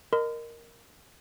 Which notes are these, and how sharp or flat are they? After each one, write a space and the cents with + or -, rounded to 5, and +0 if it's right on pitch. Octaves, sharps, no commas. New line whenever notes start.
A#4 +0 D#5 -20 C6 -45